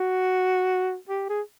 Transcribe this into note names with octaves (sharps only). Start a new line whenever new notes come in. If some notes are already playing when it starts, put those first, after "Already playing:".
Already playing: F#4
G4
G#4